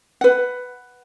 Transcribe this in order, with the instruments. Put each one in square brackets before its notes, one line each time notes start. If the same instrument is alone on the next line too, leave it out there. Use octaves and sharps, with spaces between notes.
[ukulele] B4 F#5